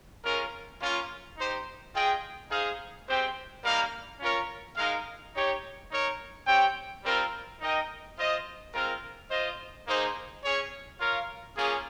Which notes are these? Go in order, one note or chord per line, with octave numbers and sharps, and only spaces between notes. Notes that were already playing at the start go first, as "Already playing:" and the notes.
G#3 C#4 F4 A#4
A#3 C#4 F4
D#4 G4 C5
F4 G#4 D#5 G5
D#4 G#4 C5 F5
G#3 C4 G4 C5 G5
G3 A#3 D#4 A#4 F5
C#4 F4 A#4 C#5
G#3 D#4 A#4 F5
D#4 G4 C#5
D#4 A#4 C#5
C4 G4 C#5 G5
G3 C4 F4 A#4
D#4 A#4 D#5 G5
F4 C5 D#5
G#3 C4 F4 A#4
F4 C5 D#5
A#3 D#4 G#4 C5 D#5
C#4 G#4 C#5
F4 A#4 C#5 F5
A#3 C#4 F4 G#4